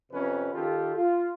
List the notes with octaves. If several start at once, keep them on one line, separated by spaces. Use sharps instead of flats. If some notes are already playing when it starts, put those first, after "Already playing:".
F2 C3 C#4 B4
D#3 F4 G4 A4
F4